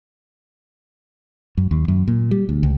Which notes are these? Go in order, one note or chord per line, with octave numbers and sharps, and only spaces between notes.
F#2
D#2
F#2
A#2
G3
D2
C#2